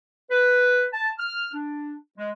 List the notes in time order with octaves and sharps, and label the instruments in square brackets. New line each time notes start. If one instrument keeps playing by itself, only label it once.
[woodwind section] B4
A5
F6
D4
G#3